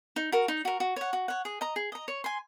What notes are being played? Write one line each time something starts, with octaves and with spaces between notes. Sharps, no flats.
D#4
F#4 A#4
D#4
F#4 A#4
F#4
C#5 F#5
F#4
C#5 F#5
G#4
D#5 A#5
G#4
D#5 A#5
C#5
G#5 C6